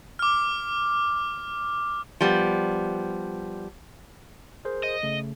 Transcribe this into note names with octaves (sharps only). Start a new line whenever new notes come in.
D6 F6
F3 G3 B3
G#4 A#4 C5
D#5
C#3 A3